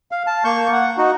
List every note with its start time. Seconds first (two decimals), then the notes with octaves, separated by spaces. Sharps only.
0.12 F5
0.27 A5
0.44 A#3 C#6 G6
0.73 F#5
0.98 D#4 F#4